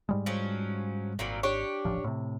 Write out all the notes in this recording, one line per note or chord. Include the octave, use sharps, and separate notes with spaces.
G#2 G3 G#3
F3 F#3 C#4
G#1 A#2 F#3 G3
D4 G4 C#5
D#1 A1 F3
A2 C3